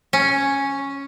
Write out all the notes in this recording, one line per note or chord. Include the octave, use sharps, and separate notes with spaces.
C#4